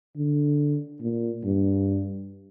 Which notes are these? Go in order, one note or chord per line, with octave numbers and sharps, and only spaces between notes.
D3
A#2
G2